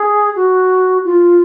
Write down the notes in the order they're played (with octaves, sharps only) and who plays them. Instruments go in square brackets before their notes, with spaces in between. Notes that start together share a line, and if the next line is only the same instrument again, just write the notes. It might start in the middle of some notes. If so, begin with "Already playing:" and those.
Already playing: [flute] G#4
F#4
F4